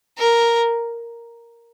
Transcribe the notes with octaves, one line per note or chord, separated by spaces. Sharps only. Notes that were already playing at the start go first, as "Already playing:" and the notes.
A#4